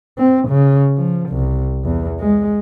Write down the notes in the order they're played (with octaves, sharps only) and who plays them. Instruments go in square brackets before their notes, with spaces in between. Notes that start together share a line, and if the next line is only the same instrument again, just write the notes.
[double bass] C4
C#3
F3
C2
E2
G#3